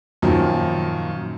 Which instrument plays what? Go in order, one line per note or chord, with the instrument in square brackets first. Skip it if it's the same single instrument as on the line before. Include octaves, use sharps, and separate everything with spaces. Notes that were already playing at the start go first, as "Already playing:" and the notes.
[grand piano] F#2 A#2 D#3 F3